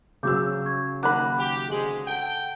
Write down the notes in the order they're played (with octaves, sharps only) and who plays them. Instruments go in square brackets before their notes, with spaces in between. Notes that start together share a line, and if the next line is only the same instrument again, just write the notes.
[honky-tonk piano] C#3 F#3 E6 [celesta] G#4 D6 G6
[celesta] C#6 G#6
[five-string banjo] D#3 A#3 B5 [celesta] F#5 D6 F#6
[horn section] G4
[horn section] G#2 D3 G#3 [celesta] G#4 F#7
[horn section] A4 G5 [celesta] F#5